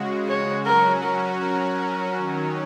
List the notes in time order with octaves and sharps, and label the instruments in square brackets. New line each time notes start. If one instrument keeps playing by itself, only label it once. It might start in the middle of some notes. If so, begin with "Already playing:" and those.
Already playing: [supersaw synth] C#3 G#3 F#4
[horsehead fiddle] C#5
[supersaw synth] F#3 C#4 F#4 [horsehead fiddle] A#4
[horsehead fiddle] A#4
A#4
[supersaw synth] D#3 F#3 C#4